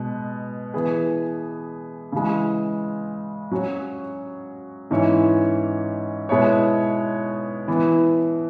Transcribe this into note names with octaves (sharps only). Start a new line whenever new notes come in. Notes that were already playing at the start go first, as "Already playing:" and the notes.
Already playing: B2 G#3 B3
E3 B3 G#4 B4
C#3 E3 G#3
F#3 C#4 F#4 C#5
G#2 E3 C#4 E4 C#5
B2 G#3 B3 E4 C#5
E3 B3 E4